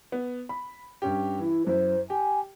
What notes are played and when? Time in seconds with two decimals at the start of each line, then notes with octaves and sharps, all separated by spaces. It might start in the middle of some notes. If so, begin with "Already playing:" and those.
0.12 B3
0.49 B5
1.02 G2 C#4 G4
1.39 E3 E4
1.67 F#2 E4 C5
2.10 G4 G#5